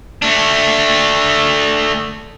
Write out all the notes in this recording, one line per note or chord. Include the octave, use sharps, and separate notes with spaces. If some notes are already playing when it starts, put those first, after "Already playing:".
A3 D4